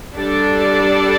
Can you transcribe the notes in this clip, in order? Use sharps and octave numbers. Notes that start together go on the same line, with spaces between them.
G3 D4 A4 D5